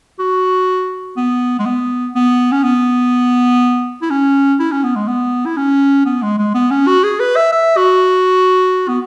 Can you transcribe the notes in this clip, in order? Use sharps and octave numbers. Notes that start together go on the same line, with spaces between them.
F#4
B3
G#3
B3
B3
C#4
B3
E4
C#4
E4
C#4
B3
G#3
B3
E4
C#4
B3
G#3
G#3
B3
C#4
F#4
G#4
B4
E5
E5
F#4
B3